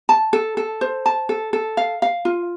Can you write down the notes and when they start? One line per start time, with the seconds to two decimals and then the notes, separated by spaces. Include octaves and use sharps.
0.09 A5
0.33 A4
0.57 A4
0.81 C5
1.06 A5
1.29 A4
1.53 A4
1.77 F5
2.02 F5
2.25 F4